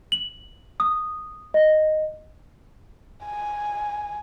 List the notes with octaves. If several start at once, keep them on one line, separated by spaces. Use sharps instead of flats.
F#7
D#6
D#5
G#5